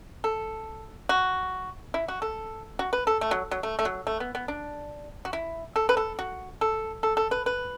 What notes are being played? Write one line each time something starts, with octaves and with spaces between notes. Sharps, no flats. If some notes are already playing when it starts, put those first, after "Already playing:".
A4
F#4
E4
F#4
A4
F#4
B4
A4
A3
F#3
F#3
A3
A3
F#3
A3
B3
B3
D4
F#4
E4
A4
B4
A4
F#4
A4
A4
A4
B4
B4